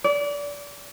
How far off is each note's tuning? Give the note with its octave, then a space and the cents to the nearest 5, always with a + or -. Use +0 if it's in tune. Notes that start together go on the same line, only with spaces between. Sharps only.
D5 -30